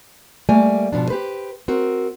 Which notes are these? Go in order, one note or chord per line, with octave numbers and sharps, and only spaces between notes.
G3 A3 A#3 D5 G#5
G#2 B2 F3 D4
G4 B4 C5
C4 F#4 A#4